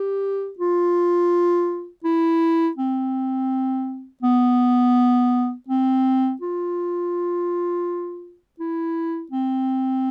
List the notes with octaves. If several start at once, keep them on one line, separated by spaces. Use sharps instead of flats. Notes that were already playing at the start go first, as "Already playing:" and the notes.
Already playing: G4
F4
E4
C4
B3
C4
F4
E4
C4